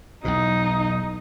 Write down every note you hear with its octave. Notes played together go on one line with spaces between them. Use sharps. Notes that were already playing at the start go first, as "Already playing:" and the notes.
B1 E2 B2 D#4